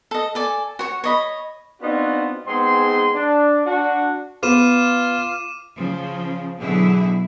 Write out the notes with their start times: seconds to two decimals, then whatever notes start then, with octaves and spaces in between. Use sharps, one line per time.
0.11 A4 D#5
0.35 A4 D5 G#5
0.79 F#4 C#5
1.04 C#5 D#5 B5
1.82 B3 C4 D4 D#4 F4 F#4
2.47 G#2 B3 C4 G#4 C6
3.15 D4
3.66 D4 F#4
4.43 B3 F4 D6 D#7 E7
5.77 C#3 F3
6.59 B2 D3 F#3 E4 G#4